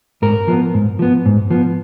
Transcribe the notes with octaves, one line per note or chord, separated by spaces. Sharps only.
G#2 A#4
F3 B3
G#2
F3 B3
G#2
F3 B3